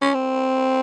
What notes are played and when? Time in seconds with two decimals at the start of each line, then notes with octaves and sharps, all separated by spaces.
0.02 C#4
0.14 C4